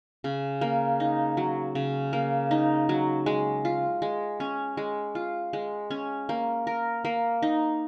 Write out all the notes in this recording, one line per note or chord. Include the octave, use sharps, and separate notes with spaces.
C#3
A#3
D#4
F#3
C#3
A#3
D#4
F#3
G#3
F4
G#3
C#4
G#3
F4
G#3
C#4
A#3
A#4
A#3
D#4